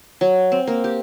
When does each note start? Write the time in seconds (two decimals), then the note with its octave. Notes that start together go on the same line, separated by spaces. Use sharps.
0.21 F#3
0.52 C4
0.67 A#3
0.84 G4